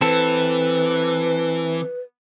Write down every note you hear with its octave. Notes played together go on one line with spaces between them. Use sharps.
E3 C4 A4 B4